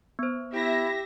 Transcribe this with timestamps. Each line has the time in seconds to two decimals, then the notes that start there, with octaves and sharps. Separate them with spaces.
0.19 B3 C5
0.53 E4 G4 E5 A#6